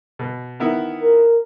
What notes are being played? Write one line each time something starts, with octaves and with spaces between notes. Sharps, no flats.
B2
D#3 B3 E4
A#4